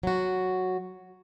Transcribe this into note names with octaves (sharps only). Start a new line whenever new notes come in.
F#3 F#4